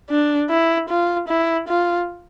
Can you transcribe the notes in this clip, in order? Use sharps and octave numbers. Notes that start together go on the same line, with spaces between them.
D4
E4
F4
E4
F4